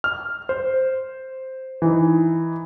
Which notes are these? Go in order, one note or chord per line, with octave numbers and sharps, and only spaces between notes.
F6
C5
E3 D#4